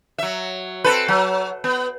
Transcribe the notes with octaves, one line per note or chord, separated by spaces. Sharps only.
F#3 E5
C4 A4 B4
F#3
B3